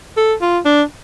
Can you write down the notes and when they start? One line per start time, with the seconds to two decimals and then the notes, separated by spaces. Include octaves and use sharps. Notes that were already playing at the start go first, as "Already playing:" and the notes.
0.17 A4
0.41 F4
0.65 D4